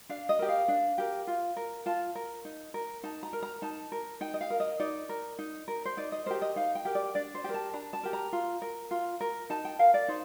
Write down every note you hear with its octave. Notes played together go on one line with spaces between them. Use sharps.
D4 F5
D#5
G4 A#4
F5
D4
G4 A#4
F4
A#4
F4 A5
A#4
D#4
A#4
D#4 A5
A#5
A#4
A#5
D#4 A5
A#4
D#4 G5
D#5
F5
A#4
D#5
D#4 D5
A#4
D#4
A#4
C5
D#4 D5
D#5
G4 A#4 C5
D#5
D#4 F5
G5
G4 A#4
D5
D4 D5
C5
G4 A#4
A5
D4 A#5
A5
G4 A#4
A#5
F4
A#4
F4
A#4
D#4 A5
G5
A#4 F5
D5
D#4 C5